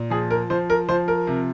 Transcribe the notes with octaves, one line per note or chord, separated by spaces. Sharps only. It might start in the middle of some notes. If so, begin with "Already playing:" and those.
Already playing: A#2
F3 G#4
A#4
F3 C5
A#4
F3 C5
A#4
C3